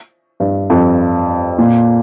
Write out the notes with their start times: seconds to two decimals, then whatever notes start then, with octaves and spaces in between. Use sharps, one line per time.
0.40 G2
0.70 F2
1.58 A#2